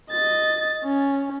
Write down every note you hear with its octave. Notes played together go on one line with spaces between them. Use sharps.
D#5 A6
C#4